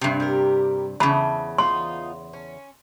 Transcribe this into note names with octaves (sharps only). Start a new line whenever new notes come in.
G2 C3
G3 G4 A#4
E2 C#3 A4 B5
B3 D#4 F4 C6
C#4